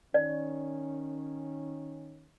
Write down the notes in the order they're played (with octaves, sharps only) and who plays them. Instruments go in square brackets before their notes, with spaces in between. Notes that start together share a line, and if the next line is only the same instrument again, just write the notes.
[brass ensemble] D#3 C#4 [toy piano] D5